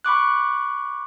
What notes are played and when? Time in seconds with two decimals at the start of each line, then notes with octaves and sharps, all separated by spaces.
0.05 B5 C#6 D6 F#6